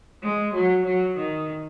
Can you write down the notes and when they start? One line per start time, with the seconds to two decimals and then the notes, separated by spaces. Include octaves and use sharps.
0.23 G#3
0.54 F#3
0.85 F#3
1.17 D#3